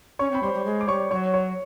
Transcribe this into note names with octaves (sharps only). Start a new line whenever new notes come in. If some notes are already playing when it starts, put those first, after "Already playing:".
C#4 C#5 C#6
C4 B5
G3 C5 C6
G3
G#3
D6
G3 C#5 C#6
F#3 C#5 C#6
C#5 C#6